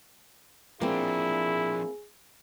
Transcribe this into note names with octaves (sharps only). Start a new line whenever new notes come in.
F3 A#3 C4 D4 E4 G#4